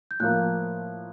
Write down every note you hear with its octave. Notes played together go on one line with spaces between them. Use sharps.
G6
A2 F3 A#3 F#6